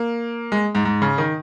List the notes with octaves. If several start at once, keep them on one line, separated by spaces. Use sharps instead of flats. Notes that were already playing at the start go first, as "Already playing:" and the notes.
Already playing: A#3
G#3
G#2
G#2
C#3
D#3